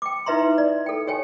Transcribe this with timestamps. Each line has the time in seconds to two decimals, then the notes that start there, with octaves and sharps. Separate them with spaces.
0.02 G5 D6
0.26 D#4 E4 B4 E5 A#5 C6
0.58 D5
0.86 A4 G5
1.07 G4 C#5 G5 G#5